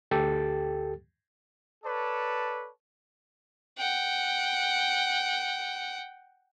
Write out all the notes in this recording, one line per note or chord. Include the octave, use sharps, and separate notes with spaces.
D2 G4 A4 G5 A6
A4 B4 C#5 D5 A5
F#5 G5